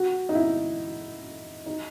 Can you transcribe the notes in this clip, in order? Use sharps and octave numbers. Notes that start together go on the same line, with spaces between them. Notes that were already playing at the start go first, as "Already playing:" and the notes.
Already playing: F#4
D#4
E4
D#4